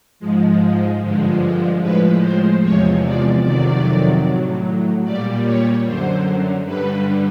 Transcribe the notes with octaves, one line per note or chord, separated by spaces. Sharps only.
G#2 F3 G#3
G2 D3 F3 G#3
A2 F3 G#3 B4
C5
E2 C3 F3 G#3 C#5
D5
F2 C3 D#3 F#3 D5
A2 F#3
A#2 G3 D5
C#5
F#2 D3 F#3 C5
G2 D3 G3 B4